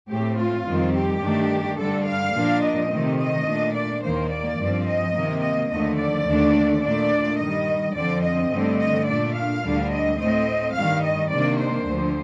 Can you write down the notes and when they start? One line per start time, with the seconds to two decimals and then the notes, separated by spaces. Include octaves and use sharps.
0.10 A2 A3 C4 G4
0.39 F4
0.67 F2 D#3 G3 C4
0.95 G4
1.22 G2 D#3 A3 D4
1.78 G2 D3 G3 D4 A4
2.07 F5
2.34 A#2 F3 A#3 D4
2.63 D#5
2.90 C3 D#3 A3 C4
3.19 D#5
3.47 A#2 A3 D4
3.75 D5
4.03 D#2 D#3 A#3 C5
4.31 D5
4.59 G2 F3 C4
4.86 D#5
5.15 C3 D#3 A#3
5.43 D#5
5.71 D#2 D3 F3 A3 D#5
5.99 D5
6.27 D#2 D3 A3 D4
6.83 A#2 A3 D4 D5
7.39 G2 D#3 G3 D#5
7.95 F2 D3 F3 C4 D5
8.23 D#5
8.51 G2 D3 A3 C4
8.79 D#5
9.07 A#2 A3 D4 D5
9.36 F5
9.64 D2 D3 G3 D4
9.91 D#5
10.19 A2 A3 C4 D#5
10.75 G2 D#3 G3 F5
11.03 D#5
11.31 C3 D#3 A#3 D4 D5
11.59 C5
11.87 D2 D3 F3